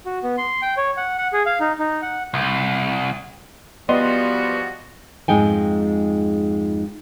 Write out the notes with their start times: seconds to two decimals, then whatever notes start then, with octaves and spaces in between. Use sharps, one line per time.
0.06 F#4
0.23 B3
0.38 C6
0.62 G5
0.77 C#5
0.97 F#5
1.18 F#5
1.33 G#4
1.46 F5
1.60 D#4
1.79 D#4
2.02 F#5
2.34 C2
3.89 F3 G3 B3 F#4 D#5 C6
5.28 F2 G#2 G#3 D#4 G5 G#5